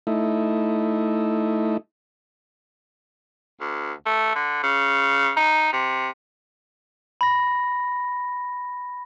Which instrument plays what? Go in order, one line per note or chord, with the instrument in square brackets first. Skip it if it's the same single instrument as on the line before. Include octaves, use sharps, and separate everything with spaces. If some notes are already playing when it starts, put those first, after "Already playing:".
[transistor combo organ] A3 D#4 E4
[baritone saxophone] D2
A3
D3
C#3
D#4
C3
[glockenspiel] B5 A#6